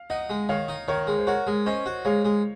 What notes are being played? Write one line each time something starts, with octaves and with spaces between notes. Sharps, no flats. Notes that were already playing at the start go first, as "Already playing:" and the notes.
Already playing: F5
D#4 D#5 F#5
G#3
D#3 C#5 F5
D#4
D#3 A#4 C#5
G#3
C5
F#4 A#4 C#5
G#3
C#4 C5 D#5
F#4
G#3 C#5 F5
G#3